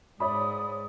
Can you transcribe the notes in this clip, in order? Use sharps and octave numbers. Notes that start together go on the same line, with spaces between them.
G#2 C#5 D5 B5 D#6